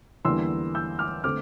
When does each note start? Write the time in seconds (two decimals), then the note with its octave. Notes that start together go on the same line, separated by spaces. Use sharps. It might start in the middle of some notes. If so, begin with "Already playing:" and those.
0.25 E2 D3 G3 A#3 C6 E6
0.75 E6 G6
0.99 D6 F6
1.24 D3 A3 C4 D6 F6